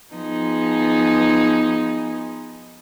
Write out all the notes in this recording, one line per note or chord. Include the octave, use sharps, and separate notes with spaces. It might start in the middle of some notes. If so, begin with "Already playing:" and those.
F3 B3 D#4 G#4